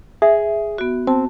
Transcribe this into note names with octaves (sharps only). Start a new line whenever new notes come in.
G#4 E5
B3 F#4
C4 A5